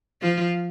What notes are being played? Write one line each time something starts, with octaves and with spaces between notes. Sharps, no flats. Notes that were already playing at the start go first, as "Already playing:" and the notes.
F3 F4